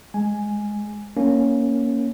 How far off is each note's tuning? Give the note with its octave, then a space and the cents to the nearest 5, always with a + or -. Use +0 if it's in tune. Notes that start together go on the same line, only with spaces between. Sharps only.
G#3 +0 G#5 +0
A#3 +5 C#4 +0